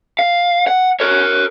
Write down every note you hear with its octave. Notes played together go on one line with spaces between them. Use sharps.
F5
F#5
A#4 C#5